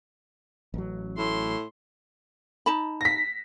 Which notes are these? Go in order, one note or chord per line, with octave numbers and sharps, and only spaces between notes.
A1 F#3
A2 C6
D#4 A5 B5
A#6 B6